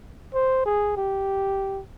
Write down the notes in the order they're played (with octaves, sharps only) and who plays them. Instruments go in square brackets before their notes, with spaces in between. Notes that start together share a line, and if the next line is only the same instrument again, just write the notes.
[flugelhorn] C5
G#4
G4